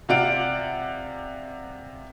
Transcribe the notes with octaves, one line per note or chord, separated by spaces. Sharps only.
C3 F4 D5 F#5 D7